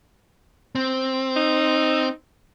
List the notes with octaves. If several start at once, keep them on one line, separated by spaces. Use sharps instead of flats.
C4
D#4